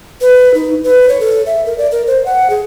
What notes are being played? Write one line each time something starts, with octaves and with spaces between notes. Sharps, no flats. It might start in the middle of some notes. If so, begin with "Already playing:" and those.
B4
D#4
B4
C#5
A4
E5
A#4
D5
A#4
C5
F#5
G#4